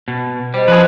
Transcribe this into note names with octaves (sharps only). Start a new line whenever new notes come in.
B2
G3 C5 D#5
F3 G#4 B4